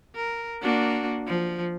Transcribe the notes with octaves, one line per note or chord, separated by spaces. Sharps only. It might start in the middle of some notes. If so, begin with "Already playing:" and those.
A#4
A#3 D4 F#4
F3